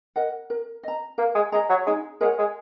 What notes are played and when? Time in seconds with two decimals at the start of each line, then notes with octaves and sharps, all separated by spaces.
0.16 A#4 D#5 F#5
0.50 A#4
0.83 D#5 A#5
1.18 A#3 A#4
1.35 G#3
1.52 G#3 D#5 A#5
1.69 F#3
1.86 G#3 D#4
2.21 G#3 A#4 C#5 F#5
2.39 G#3